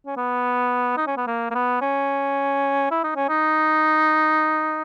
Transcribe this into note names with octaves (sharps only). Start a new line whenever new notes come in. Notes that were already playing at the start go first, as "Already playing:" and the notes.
C#4
B3
D#4
C#4
B3
A#3
A#3
B3
C#4
E4
D#4
C#4
D#4